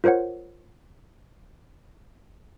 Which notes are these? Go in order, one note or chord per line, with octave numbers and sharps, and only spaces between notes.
F4 A#4 C5 C#5 F#5